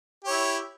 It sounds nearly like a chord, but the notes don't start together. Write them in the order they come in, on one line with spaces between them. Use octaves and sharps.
G4 C#5 E4